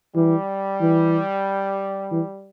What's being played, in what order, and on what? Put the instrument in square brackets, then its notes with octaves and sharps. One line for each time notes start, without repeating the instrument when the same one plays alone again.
[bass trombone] E3 [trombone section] G3
[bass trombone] E3
E3